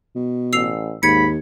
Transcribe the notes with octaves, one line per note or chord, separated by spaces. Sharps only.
B2
A1 E6 C7 F7
D#2 G#2 B5 G#6 C#7